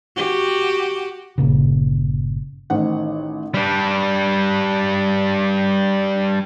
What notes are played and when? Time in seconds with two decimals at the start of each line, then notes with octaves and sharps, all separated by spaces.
0.16 F#4 G4
1.38 G1 A#2 C#3
2.70 A1 D#3 C5 F#5
3.54 G3 D4